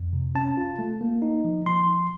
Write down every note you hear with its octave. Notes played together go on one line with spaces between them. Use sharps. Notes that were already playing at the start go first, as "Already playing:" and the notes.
Already playing: F2
C3
C#4 A5
F4
A3
A#3
D#4
F3
F3 C6